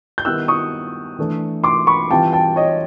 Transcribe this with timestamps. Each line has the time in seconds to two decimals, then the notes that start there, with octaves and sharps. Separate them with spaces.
0.18 G6
0.25 D#3 G3 B3 E4 E6 F#6
0.48 C#6 D#6
1.19 E3 A3 D4
1.64 C6 D6
1.87 B5 C#6
2.11 E3 G3 C4 F4 G5 A5
2.33 G5 A5
2.56 C#5 D#5